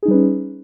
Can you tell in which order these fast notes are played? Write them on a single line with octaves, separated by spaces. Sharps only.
G#4 D#4 G3 B4 C#4